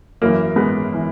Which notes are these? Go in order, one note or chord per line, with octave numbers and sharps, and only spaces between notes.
F#2 E3 A#3
G#3 B3
E3